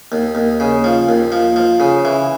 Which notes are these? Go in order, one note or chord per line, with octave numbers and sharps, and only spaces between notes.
D#2
D#2
C#3
F3
D#2
F3
F3
C#3
E3